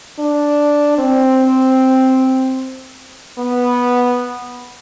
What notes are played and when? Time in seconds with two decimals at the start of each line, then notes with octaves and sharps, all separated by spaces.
0.19 D4
0.98 C4
3.38 B3